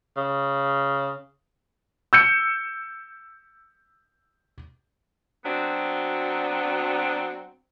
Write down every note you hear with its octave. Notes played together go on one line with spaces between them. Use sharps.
C#3
E6 G6 C#7
F#3 B3 C4 D4 F#4